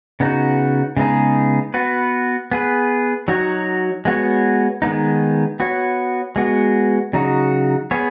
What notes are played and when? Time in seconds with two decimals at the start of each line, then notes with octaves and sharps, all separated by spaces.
0.20 C#3 B3 D#4 F#4
0.97 C#3 G#3 B3 D#4 G#4
1.74 B3 F#4 B4
2.51 B3 G#4 B4
3.28 F#3 D#4 F#4 C#5
4.05 G#3 B3 F#4 C#5
4.82 D#3 G#3 B3 D#4
5.60 B3 F#4 C#5
6.36 G#3 B3 F#4
7.13 C#3 F#3 D#4 F#4
7.91 B3 G#4 C#5